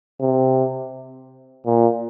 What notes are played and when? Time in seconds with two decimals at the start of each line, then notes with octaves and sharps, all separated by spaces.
0.21 C3
1.66 A#2